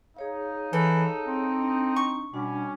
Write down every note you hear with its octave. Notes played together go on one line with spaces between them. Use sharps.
D#4 G#4 C#5 F5
E3 A4
C4
D4
C#6
B2 G3 C#4 D4 F#4